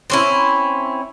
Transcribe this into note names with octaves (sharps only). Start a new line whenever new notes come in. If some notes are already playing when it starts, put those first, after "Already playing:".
C4 C#4 E4